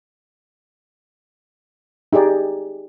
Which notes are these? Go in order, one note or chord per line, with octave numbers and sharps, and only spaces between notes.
D#4 G4 G#4 D5